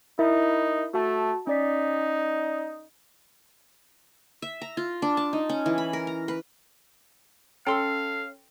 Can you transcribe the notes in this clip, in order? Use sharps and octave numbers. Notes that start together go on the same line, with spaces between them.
D#4 E4 A#4 E5
A3 F#4 A5
C#4 D#4 D5 B6
E5
A#5
F4
D4
A5
D#4
C#4
E3
B5
A#4
A#5
B4
C#4 A4 F5 G5 C6 E6